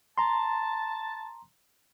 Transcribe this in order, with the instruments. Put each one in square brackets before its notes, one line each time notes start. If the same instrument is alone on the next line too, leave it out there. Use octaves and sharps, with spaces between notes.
[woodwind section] A5 [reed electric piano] A#5 C6